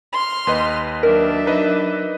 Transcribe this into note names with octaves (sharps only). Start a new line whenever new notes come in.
C6 F6
D#2 B4 D#5
F#3 D4 A#4 E5
D#4 B4 D#5